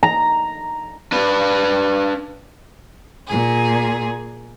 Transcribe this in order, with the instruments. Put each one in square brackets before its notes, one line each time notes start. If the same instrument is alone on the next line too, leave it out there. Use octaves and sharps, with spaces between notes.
[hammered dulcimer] A#5
[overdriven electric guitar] D4 B4
[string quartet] A#2 G#4